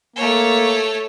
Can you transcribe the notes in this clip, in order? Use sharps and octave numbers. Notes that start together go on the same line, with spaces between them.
A3 A#3 C#5